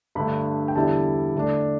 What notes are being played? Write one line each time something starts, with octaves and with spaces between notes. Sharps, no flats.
G2 D3 A3 B5
G5
E2 D3 G3 E4 A5
D3 A3 D4